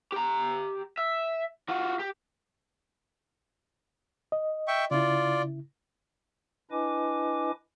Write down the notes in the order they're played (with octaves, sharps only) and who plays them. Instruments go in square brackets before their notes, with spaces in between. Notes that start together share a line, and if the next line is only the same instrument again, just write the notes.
[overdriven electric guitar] G4 A#5
E5
F4 F#4
G4
[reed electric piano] D#5
[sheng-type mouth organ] E5 G5 C#6
[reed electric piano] C#3 E4 [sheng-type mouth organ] F4 D5
[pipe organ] D4 E4 B4 D#5 G#5 D6